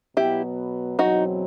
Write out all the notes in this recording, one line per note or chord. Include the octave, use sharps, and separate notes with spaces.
B2 F#3 B3 E4 G4
E2 B2 F#3 C4 D#4 F#4